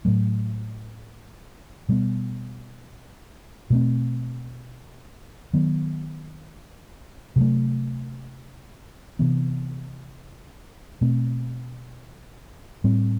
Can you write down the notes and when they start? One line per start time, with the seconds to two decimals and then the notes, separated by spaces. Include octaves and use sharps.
0.05 A2 F#3 A3
1.89 B2 G3 B3
3.70 B2 A3 C4
5.53 D#3 F#3 B3
7.36 C3 F#3 A3
9.19 C3 E3 B3
11.01 B2 A3 C4
12.84 A2 G3 C4